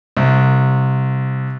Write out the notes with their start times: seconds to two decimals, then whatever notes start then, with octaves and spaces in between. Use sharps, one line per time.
0.17 C2